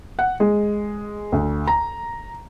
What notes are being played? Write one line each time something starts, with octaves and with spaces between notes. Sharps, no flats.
F#5
G#3
D2
A#5